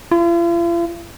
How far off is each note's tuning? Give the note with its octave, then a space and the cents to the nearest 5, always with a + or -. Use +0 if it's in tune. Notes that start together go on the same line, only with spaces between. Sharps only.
F4 -45